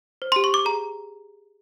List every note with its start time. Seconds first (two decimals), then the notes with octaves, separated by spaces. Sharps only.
0.22 C5
0.32 C6
0.36 G4
0.44 C#6
0.51 G4 D6
0.65 G#4 A#5